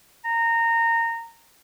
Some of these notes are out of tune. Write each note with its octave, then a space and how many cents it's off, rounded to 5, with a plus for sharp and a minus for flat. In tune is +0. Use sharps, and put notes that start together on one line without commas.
A#5 -20